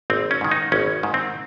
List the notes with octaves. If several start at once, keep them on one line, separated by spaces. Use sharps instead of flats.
G#1 C4
C#4
G#2 D#3
D#4
G#1 C#4
G#2 D#3
C4